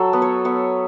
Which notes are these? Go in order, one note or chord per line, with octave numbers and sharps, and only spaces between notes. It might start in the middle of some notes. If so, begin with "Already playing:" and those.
Already playing: F#3 A4
B3
C#5
B3 C#5